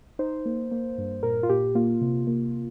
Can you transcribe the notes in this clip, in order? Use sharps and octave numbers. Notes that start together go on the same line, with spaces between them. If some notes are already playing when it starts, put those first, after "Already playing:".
D#4 C5
A#3
A#3
G2
A#2 A#4
F4
A#2 G4
A#3 F4
C3
A#3